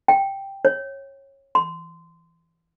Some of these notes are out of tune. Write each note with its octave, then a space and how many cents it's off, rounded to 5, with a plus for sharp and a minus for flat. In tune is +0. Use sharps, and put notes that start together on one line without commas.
G5 +0
C#5 -20
C6 -20